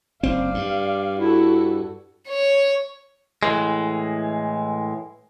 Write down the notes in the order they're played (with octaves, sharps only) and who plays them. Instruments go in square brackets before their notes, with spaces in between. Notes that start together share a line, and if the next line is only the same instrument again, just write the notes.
[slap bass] F#1 C4 [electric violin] D5 F5
[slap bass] G2
[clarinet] E4 [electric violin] F#4 A4
[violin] C#5
[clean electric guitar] A2 E3 G#3